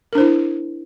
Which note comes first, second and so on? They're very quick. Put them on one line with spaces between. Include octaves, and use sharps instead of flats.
A#4 D4 C5 E4